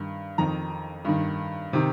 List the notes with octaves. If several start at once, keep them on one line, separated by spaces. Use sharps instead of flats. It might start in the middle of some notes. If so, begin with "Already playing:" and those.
Already playing: G2 D#3
F2 D#3 A#5
G2 D#3
C3 D#3